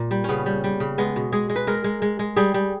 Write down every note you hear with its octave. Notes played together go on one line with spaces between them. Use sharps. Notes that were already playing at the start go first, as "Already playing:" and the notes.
Already playing: A#2
G3
C#3 B3 C#4
G3
G3
C#3
G#3 B3
B2
G#3 G#4
G#3
B4
G#3 A#4
G#3
G#3
G#3
G3 G#4
G3